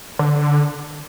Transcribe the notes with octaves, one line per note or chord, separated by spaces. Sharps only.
D3